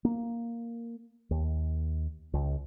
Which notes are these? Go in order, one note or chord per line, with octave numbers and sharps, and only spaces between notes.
A#3
D#2
C#2